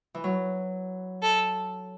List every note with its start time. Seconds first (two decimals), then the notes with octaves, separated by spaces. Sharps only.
0.14 E3
0.24 F#3
1.23 A4